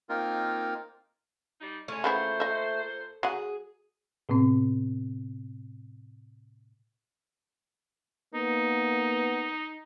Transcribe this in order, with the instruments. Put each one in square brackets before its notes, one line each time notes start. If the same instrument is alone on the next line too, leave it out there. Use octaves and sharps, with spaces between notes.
[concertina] A#3 C4 D#4 F4 A#4
[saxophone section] G3 D#4
[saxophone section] G#3 C#4 [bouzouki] A3
[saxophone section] A#2 C5 [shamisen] C#3 B3 E4
[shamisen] D#5 E5
[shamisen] F#3 F#5 [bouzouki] G#4
[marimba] A2 C3 B3 C4
[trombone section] A#3 B3 [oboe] D#4